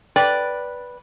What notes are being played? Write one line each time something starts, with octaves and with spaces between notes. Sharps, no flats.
B4 D5 G5